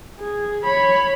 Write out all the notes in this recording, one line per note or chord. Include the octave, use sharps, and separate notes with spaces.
G#4
C#5 B5